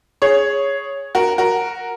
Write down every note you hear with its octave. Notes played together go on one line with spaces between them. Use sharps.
G#4 C#5
F#4 A#4
F#4 A#4